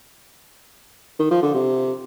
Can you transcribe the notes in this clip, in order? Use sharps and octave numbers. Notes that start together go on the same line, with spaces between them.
D#3
F3
D3
C3